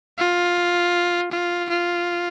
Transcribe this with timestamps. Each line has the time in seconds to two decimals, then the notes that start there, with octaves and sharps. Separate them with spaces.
0.18 F4
1.32 F4
1.70 F4